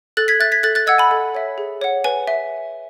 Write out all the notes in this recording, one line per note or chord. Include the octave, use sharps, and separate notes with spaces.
A4 F#6 A6
G#6 B6
E5 F#6 A6
G#6 B6
A4 F#6 A6
F#6 A6
D#5 F#5 E6 G#6
G#5 B5
A4
C#5 E5
G#4
C#5 F#5
B4 G#5
E5